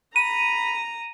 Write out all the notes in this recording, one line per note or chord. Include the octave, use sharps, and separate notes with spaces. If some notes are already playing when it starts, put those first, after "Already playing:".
A#5 B5 D#7